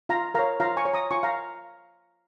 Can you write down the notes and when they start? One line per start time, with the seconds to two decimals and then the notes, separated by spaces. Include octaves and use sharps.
0.09 F4 F5 A#5
0.34 A#4 C#5 F5 A#5
0.60 F4 F5 A#5
0.77 G#5 C#6
0.85 C#5
0.93 A#5 D#6
1.11 F4 G#5 C#6
1.23 F5 A#5